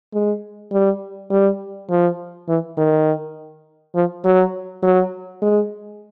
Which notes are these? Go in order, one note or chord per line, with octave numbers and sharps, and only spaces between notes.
G#3
G3
G3
F3
E3
D#3
F3
F#3
F#3
G#3